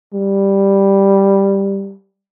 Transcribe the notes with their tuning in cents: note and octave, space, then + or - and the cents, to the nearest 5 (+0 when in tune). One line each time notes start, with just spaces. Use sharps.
G3 +5